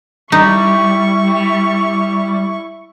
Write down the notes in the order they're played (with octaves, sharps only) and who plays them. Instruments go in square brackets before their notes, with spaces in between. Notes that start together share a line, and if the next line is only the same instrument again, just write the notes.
[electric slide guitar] G3 [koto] D#4 [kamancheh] E4 C#6